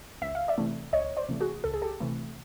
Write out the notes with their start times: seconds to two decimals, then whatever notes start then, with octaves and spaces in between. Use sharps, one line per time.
0.22 C#2 E5
0.35 F5
0.48 D5 E5
0.58 C3 E3 A3
0.93 C#2 C#5 D#5
1.17 C5 D5
1.29 C3 E3 A3
1.41 F#4 G#4
1.64 C#2 A4
1.74 G#4
1.82 G4 A4
2.00 C3 E3 A3